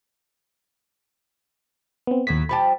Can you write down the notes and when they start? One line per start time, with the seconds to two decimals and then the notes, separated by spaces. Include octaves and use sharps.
2.07 B3 C4
2.27 D#2 A2 F#3 B6
2.49 F3 G3 G4 A5 B5